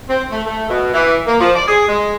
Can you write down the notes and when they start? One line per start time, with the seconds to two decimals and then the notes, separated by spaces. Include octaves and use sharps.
0.09 C4
0.32 A3
0.46 A3
0.70 B2
0.93 E3
1.27 A#3
1.40 F3
1.56 D5
1.67 G#4
1.88 G#3